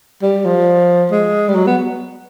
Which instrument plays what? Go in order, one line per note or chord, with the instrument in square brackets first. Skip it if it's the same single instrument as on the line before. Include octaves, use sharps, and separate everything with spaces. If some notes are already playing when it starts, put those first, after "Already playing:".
[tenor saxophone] G3
F3
G#3
G3
F#3
B3